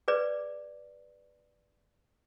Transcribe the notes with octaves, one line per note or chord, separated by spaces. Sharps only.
G#4 B4 D5